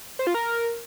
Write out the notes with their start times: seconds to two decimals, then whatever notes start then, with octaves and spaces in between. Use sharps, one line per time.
0.19 C5
0.27 F4
0.34 A#4